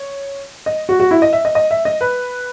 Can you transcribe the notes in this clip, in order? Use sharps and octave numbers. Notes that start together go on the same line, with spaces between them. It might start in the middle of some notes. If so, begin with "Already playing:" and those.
Already playing: C#5
D#5
F#4
F#4
E4
D#5
E5
D#5
D#5
E5
D#5
B4